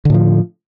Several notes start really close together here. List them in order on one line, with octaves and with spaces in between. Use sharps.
D3 A2 F3